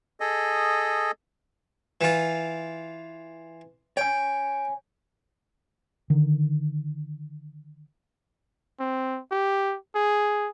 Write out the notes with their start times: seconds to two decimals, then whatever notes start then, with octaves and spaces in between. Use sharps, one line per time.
0.20 G#4 A4 D#5
2.01 E3 F4
3.97 C#5 G5 G#5
6.10 D3 D#3
8.80 C4
9.32 G4
9.95 G#4